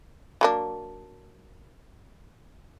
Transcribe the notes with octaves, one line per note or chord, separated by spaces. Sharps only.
F#3 A#3 D4